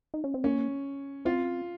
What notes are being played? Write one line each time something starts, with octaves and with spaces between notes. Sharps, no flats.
D#4
C#4
C4
A#3 C#4
C4 F4